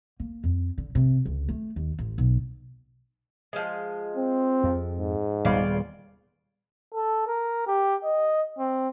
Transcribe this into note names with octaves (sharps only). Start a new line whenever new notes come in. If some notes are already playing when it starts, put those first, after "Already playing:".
A#3
F2
D3
C3
C#2
A3
D#2
A1
B1
F3 G#3
C4
F2
G#2
D#1 C#3 G3 B3 F4 D5
A4
A#4
G4
D#5
C4